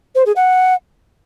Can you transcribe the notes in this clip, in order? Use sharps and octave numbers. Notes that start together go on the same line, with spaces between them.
C5
G#4
F#5